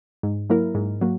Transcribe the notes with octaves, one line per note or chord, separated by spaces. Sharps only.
G#2
F#3 A#3 E4 A#4
G#2
F#3 A#3